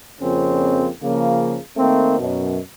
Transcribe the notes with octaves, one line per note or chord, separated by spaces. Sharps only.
F2 C#3 F3 A#3 C4 C#4
C#3 F3 A#3
D#3 A3 A#3 C4
F#2 B2